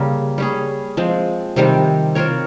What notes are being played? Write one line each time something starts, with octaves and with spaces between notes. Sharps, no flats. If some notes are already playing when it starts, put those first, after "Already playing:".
Already playing: C#3 G3 A#3
G3 C#4 G#4
F3 G#3 C4
C3 D#3 G3 C4
C4 F4 A#4 C#5